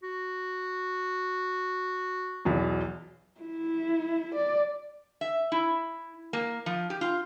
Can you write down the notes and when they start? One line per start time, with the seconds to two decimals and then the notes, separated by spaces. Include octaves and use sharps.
0.03 F#4
2.45 B1 E2 F#3
3.41 E4
4.35 D5
5.21 E5
5.52 E4
6.33 A#3
6.66 F3
6.90 G4
7.01 F4